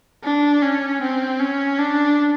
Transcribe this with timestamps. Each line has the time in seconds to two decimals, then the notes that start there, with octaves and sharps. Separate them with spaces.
0.23 D4
0.62 C#4
1.02 C4
1.40 C#4
1.79 D4